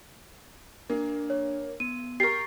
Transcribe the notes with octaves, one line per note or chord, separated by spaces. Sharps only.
A#3 D4
C#5
B3 D#7
G4 A#4 C#6 A6 C7